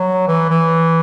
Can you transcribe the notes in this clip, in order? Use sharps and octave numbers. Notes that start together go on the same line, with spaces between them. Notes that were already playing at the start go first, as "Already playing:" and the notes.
Already playing: F#3
E3
E3